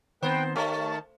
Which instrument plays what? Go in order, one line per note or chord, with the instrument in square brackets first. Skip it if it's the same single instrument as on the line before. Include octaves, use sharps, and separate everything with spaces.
[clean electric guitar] D#3 B3 C4 [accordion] B4 G5 [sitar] C5
[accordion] D#3 A5 [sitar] A3 [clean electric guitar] G4 C#5